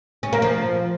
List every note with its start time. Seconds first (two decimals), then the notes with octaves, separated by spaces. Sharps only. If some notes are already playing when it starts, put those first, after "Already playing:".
0.23 C#4
0.33 A#3
0.42 F3